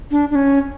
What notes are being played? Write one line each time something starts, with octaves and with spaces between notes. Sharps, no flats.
D4
D4
C#4